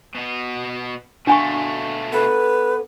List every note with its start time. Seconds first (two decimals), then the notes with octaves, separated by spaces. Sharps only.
0.15 B2 B3
1.27 B2 A3 D4 F#4 F5 G#5 C#6
2.12 B3 A4 B4